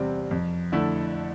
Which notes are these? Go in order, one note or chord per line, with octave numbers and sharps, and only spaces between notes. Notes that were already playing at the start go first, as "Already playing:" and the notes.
Already playing: E2 C3 G3 C4
F2
D3 A3 E4 A4